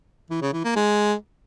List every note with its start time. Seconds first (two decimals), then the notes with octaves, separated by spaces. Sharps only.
0.30 E3
0.42 C#3
0.53 E3
0.64 A#3
0.76 G#3